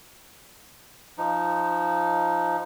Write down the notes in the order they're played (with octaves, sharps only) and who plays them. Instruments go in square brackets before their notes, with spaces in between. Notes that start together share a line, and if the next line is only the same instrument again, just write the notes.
[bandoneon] F3 D#4